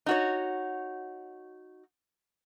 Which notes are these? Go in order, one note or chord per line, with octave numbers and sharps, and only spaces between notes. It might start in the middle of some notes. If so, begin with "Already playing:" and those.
D#4 F#4 C#5